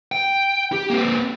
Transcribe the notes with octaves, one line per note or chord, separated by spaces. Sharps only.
G5
G4
A#3 C4